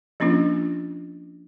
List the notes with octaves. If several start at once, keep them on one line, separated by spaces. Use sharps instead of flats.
F3 A#3 C#4 D4 F4